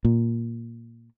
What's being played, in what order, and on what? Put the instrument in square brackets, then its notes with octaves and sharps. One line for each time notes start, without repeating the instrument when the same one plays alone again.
[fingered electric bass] A#2